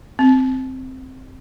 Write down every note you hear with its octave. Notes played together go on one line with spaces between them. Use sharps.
C4